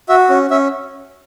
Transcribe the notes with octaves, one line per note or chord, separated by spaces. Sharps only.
F#4 E5
C#4
C#4 E5